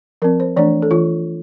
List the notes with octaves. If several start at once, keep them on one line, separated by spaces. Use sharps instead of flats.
F3 C4 A#4
C5
E3 A3 D4 D5
A4
E3 F4